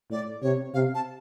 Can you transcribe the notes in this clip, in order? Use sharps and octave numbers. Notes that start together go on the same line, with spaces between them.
A2 D5
C3 C#5
C3 F5
A5